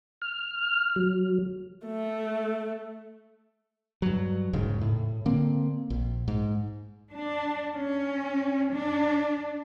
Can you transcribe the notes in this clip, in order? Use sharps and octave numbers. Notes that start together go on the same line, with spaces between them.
F6
F#3
A3
G2 F#3
E1 G#2 C#3
A2
D3 A#3 C4
A#1
G#2
D4
C#4
D4